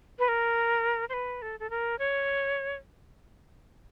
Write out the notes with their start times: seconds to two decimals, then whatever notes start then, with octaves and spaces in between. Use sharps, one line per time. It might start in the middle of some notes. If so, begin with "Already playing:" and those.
0.19 B4
0.28 A#4
1.09 C5
1.14 B4
1.42 A4
1.60 A4
1.70 A#4
1.99 C#5